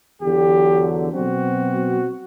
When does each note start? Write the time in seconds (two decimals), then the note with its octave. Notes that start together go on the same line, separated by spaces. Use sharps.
0.22 E2 D3 F#3 G4
1.12 B2 F#3 C4 F#4